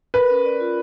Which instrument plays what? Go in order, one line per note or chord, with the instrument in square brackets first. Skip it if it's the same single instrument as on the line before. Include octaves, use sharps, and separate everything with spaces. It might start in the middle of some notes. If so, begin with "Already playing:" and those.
[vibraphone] A#4 [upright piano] B4
[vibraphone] C#4
D5
F4